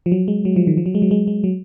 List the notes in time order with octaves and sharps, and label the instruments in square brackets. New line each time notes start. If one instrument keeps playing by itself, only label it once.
[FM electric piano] F3
F#3
G#3
F#3
F3
D#3
F3
F#3
G#3
F#3
G#3
G#3
F#3